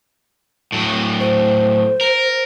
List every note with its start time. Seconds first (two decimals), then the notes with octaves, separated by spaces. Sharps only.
0.72 A2 F#3
1.20 C5
2.01 A#4